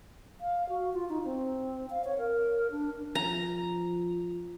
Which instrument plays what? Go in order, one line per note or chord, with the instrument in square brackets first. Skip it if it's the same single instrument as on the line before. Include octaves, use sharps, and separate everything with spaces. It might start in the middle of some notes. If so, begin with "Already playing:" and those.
[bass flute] F5
F#4
F4
D#4
C4
F5
C#5
A#4
D4
[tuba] F3 [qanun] A#5